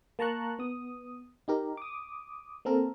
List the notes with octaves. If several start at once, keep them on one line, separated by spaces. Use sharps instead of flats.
A#3 A5 A#5 C#6 F#6
B3 D#6
D#4 G4 A#4
D6 D#6
A#3 C4 A4 A#4